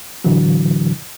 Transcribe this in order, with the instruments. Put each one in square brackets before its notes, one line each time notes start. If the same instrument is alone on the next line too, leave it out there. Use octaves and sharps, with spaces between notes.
[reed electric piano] A2 D3 E3 F#3